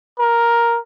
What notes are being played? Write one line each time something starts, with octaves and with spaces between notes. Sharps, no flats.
A#4